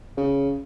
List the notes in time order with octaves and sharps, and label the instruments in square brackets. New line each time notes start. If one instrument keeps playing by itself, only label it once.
[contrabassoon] C#3